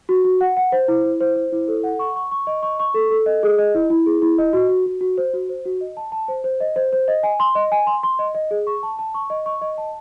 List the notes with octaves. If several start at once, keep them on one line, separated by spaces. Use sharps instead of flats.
F#4
F#4
F#5
F#5
C5
E4
E4
C5
C5
E4
A4
F#5
C#6
C#6
C#6
D#5
C#6
C#6
A4
A4
D#5
G#4
D#5
E4
E4
G#4
E4
D#5
F#4
F#4
F#4
F#4
C5
F#4
C5
F#4
D#5
A5
A5
C5
C5
D#5
C5
C5
D#5
G#5
C6
D#5
G#5
C6
C6
D#5
D#5
G#4
C#6
A5
A5
C#6
D#5
C#6
D#5
A5